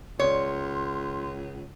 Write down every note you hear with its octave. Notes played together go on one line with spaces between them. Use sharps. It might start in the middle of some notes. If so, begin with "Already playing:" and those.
C#2 C#5 C6